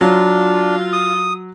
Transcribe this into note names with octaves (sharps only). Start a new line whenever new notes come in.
F#3 D4 F4
D#6